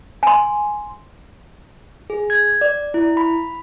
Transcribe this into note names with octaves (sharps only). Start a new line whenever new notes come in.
G#5 C6
G#4
G#6
D5
E4
B5